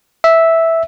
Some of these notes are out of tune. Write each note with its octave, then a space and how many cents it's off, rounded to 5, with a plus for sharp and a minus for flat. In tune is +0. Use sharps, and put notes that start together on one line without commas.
E5 -5